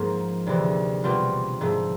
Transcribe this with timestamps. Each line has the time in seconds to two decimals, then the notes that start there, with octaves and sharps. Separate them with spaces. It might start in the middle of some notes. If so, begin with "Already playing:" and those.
Already playing: G#2 F3 A#3
0.46 D2 C3 E3
1.04 B2 G3 C4 F4
1.61 G#2 F3 A3